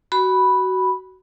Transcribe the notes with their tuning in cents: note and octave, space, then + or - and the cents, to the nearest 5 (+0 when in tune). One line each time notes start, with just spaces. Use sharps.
F#4 +15 B5 -5